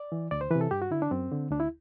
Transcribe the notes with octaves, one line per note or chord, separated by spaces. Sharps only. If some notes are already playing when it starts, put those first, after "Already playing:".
Already playing: D5
E3
D2 D5
C5
C3 E3 B4
A4
G2 G4
F#4
D3 E4
D4
F#2 C4
D3
D2 D4
E4